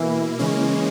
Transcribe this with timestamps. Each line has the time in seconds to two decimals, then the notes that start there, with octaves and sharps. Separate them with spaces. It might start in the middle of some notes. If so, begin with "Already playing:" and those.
Already playing: B2 E3 A#3 E4
0.38 C#3 E3 G#3 A#3 C#4